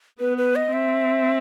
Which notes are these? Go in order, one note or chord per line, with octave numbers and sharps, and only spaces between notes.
B3 B4
B4
D#5
C4 E5